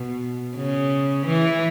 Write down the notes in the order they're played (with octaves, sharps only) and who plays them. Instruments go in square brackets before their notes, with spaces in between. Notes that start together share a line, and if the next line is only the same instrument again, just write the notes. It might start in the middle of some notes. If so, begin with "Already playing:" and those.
Already playing: [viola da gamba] B2
C#3
E3